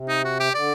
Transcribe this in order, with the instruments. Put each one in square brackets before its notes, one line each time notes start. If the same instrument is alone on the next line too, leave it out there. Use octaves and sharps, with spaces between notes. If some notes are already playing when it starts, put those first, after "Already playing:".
Already playing: [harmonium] C3
[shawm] D#4
F#4
G4
[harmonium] D3 [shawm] D5